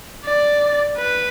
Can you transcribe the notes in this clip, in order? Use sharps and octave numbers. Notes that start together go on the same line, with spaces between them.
D5
B4